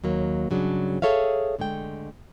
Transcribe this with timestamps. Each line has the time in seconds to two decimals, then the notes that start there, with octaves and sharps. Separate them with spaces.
0.04 D#2 F#3 A#3
0.50 G2 C#3 F#3 G#3 C#4 D4
1.02 G#4 A4 C#5 E5 F5
1.59 D3 G#3 A3 G5